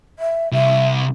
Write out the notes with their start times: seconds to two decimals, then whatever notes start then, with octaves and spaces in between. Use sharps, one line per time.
0.19 E5
0.52 C2 E5